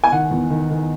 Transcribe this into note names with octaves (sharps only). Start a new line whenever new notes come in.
G#5
D#3 F#5
E2
D#3
D#3